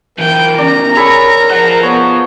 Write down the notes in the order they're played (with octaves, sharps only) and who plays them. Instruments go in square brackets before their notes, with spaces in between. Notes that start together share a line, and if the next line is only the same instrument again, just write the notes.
[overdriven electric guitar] E3 F4 [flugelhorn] A#4 [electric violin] G5
[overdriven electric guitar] E2 C#3 [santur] D5 [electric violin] A#5
[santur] G#4 A4 B5 [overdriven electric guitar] C#5
[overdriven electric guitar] F4 C5 [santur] F#5
[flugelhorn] B3 [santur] C#5